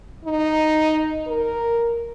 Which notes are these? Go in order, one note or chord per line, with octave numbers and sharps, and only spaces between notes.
D#4
A#4